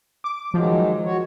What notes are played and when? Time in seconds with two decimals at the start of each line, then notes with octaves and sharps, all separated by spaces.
0.24 D6
0.54 D#3 F3 F#3 G#3
1.05 F#4 C#5